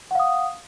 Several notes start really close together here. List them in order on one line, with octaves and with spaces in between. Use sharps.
F#5 F5 D#6